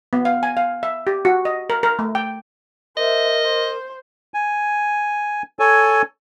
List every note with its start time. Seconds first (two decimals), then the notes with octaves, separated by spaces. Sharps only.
0.13 B3
0.25 F5
0.43 G#5
0.57 F5
0.83 E5
1.07 G4
1.25 F#4
1.45 D#5
1.70 A#4
1.83 A#4
1.99 A3
2.15 G5
2.97 A#4 C5 D#5 E5
3.45 C5
4.34 G#5
5.59 A4 C#5 G#5